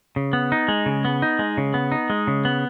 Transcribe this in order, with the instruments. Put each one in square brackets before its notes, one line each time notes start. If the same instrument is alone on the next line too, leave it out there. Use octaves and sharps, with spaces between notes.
[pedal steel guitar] C#3
B3
D#4
G#3
C#3
B3
D#4
G#3
C#3
B3
D#4
G#3
C#3
B3